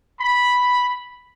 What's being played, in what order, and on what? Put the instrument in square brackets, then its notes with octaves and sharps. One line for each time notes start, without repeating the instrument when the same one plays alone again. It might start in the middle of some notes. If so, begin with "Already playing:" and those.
[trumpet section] B5